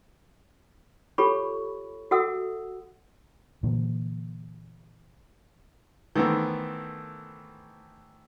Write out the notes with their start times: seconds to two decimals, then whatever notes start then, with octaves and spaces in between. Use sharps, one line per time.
1.18 F4 G4 A4 C#5 B5 C#6
2.11 F#4 A4 E5 F#5 D#6 E6
3.63 A#2 D3 E3 A#3
6.15 D#3 E3 A3 B3 C4